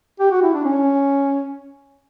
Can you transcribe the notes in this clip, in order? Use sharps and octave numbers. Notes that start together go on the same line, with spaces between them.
G4
F#4
E4
D4
C#4